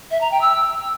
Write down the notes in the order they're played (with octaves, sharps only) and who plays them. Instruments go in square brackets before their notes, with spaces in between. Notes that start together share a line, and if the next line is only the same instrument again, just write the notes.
[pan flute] E5
A#5
G5
E6